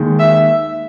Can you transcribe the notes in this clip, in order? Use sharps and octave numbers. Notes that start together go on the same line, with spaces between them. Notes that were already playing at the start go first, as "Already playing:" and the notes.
Already playing: D#2 D#3 G#3
E5